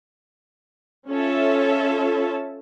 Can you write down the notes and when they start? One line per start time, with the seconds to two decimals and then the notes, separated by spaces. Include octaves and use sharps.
1.09 C#4 F4 A4 C#5 E5 A5